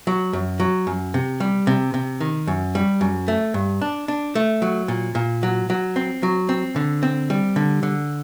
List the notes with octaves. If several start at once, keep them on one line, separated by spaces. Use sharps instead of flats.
F#3
F#2
F#3
F#2
C3
G3
C3
C3
D#3
F#2
G3
F#2
A3
G2
D4
D4
A3
F#3
A#2
A#2
F#3
F#3
C4
F#3
C4
D3
C4
G3
D3
D3